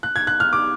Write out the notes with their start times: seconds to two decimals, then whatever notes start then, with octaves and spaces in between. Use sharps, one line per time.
0.03 F#6
0.16 G#6
0.27 F#6
0.40 F6
0.53 D6